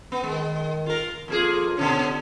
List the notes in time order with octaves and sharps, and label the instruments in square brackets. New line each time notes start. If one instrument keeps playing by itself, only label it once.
[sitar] B3
[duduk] D#3 [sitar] G#3
[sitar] F4 A#4
[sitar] F2 A#3 G#4 [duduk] F4
[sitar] B2 D3 C#4